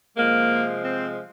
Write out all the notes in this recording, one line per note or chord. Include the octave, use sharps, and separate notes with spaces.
C3 F3 G#3 A#3
C4